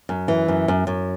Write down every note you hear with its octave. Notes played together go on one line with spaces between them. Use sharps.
F#2
E3
F#2
F#2
F#2